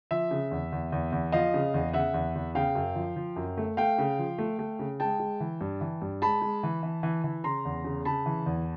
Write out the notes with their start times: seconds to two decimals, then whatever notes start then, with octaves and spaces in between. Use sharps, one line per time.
0.11 F3 E5
0.31 C#3
0.51 E2
0.72 E2
0.92 E2
1.12 E2
1.32 F3 D#5 F5
1.54 C#3
1.74 E2
1.93 C#3 E5 F#5
2.14 E2
2.35 E2
2.55 C#3 F5 G5
2.75 F#2
2.96 F3
3.16 F3
3.36 F#2
3.57 A3
3.77 A3 F5 G5
3.98 C#3
4.19 F3
4.38 A3
4.59 A3
4.79 C#3
5.00 G#3 G5 A5
5.20 G#3
5.40 E3
5.61 G2
5.81 E3
6.02 G2
6.22 G#3 A5 B5
6.42 G#3
6.63 E3
6.83 E3
7.03 E3
7.24 E3
7.44 C#3 A#5 C6
7.65 E2
7.84 C#3
8.05 C#3 A5 B5
8.26 E3
8.46 E2